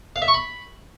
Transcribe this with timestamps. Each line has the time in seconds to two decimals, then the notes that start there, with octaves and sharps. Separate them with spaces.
0.16 F5
0.22 E5
0.28 C#6
0.34 B5